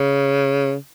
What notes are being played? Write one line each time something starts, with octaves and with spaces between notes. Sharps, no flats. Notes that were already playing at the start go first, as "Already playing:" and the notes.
Already playing: C#3